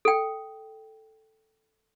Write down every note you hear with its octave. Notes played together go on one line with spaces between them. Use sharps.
A4 G5